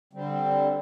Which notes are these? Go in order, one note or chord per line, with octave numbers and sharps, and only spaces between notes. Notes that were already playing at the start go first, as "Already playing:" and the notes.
D3 G3 C4